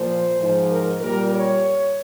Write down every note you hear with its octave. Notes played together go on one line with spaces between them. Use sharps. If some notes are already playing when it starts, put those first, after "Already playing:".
Already playing: A#2 F3 C5
G#2 F3
A#4
A#2 G3 A#4
C#5